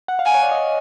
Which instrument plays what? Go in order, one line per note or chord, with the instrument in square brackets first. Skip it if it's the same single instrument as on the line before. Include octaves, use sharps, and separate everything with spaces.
[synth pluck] F#5
F5
[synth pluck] F#5 [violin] G#5
[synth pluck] C#5
D5
D#5